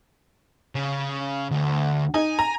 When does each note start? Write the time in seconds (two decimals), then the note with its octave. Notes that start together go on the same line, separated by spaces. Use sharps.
0.75 C#3
1.51 D2
2.14 D#4 G#5
2.39 A#5